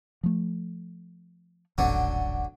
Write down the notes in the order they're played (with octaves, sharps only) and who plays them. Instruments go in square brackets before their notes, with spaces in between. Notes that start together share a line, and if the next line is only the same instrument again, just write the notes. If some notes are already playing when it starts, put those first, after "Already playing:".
[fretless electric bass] F3 A3
[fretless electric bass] D#1 A1 [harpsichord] D3 F#3